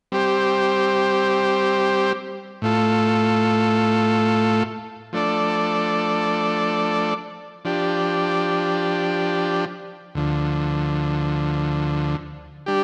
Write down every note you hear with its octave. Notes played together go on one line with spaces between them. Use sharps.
G3 C4 G4 C5
A2 A3 F4 A4
F3 A3 D4 A4 D5
F3 D4 G4
D2 D3 F3
G3 D4 G4